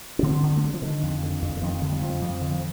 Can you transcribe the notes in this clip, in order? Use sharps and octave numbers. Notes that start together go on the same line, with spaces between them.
D4
D3 C4
D3
A3
D3 G3
F3
D3 D#3
F2
D3
F2 D3
D3
F2 D#3
D3 D#3
G3
F2 F3
F2
D3
F3